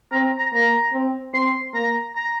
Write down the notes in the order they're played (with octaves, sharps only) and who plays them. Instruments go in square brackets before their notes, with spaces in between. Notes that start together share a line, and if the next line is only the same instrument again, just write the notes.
[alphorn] C4 [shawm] A#5
[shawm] A#5
[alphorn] A#3 [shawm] A#5
[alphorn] C4
[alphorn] C4 [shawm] C6
[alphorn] A#3 [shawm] A#5
[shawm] A#5